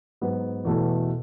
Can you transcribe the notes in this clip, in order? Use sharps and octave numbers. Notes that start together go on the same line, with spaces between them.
G#2 F#3 B3
E2 B2 A3 E4 A4